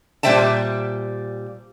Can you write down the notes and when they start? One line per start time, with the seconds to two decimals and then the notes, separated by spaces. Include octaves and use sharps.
0.23 A#2 G3 C5 E5 G5 A5